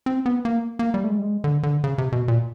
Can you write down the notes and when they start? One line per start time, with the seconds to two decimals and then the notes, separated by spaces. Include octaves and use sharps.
0.06 C4
0.26 B3
0.45 A#3
0.79 A#3
0.94 G3
1.04 A3
1.09 G#3
1.19 G3
1.23 G#3
1.44 D3
1.63 D3
1.84 C#3
1.98 C3
2.12 B2
2.28 A#2